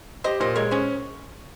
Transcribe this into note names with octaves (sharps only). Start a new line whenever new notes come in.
G4 C5 D#5
A#2 C5 D#5
G#3 A#4 C#5
C#4 G#4 C5